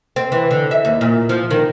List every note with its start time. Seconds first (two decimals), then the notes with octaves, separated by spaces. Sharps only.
0.16 C4
0.32 E3
0.51 D3
0.71 E5
0.85 D#2
1.01 A#2
1.29 F3
1.51 D#3